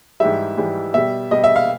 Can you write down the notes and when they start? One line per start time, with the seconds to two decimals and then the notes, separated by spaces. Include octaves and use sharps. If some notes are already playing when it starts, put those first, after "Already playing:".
0.20 G#2 E3 G3 E5
0.57 G#2 E3 G3
0.94 B2 G3 E5
1.31 B2 G3 D#5
1.44 E5
1.56 F5